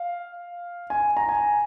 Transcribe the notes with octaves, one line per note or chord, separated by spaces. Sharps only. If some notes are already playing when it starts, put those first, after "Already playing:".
Already playing: F5
G#5
A#5
G#5